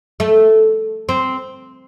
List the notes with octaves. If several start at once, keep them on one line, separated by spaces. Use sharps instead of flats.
A3
C4